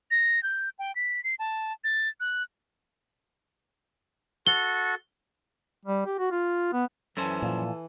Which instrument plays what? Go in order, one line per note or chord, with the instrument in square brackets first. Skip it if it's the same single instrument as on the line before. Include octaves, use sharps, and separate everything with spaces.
[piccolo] A#6
G6
G5
B6
C7
A5
A6
F#6
[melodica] F#4 A4 [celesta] G7
[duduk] G3
G4
F#4
F4
B3
[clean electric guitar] F#2 C#4 C5 [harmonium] E3 [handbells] A4 G#5 A5
[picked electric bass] A#2 F3